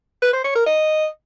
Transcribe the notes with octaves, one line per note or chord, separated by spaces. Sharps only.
B4
C5
C#5
A#4
D#5